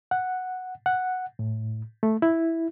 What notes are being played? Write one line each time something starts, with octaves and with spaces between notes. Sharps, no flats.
F#5
F#5
A2
A3
E4